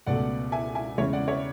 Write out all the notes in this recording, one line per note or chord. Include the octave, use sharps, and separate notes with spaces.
C#2 B2 A3 D5 F#5
E5 G#5
E5 G#5
E2 C#3 G#3 C#5 E5
D5 F#5
C#5 E5